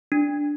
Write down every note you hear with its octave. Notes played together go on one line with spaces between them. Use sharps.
D4